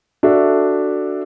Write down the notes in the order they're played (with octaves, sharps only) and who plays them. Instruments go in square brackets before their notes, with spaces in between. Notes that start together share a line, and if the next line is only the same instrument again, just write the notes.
[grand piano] D4 F#4 A4 E5